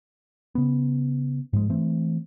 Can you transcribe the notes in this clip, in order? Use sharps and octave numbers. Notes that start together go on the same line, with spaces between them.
C#3 B3
G#2 F3 G#3
E3 A3 C4